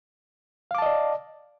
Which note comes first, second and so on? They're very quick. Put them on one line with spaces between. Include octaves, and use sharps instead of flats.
F5 D6 A5 D#5 D5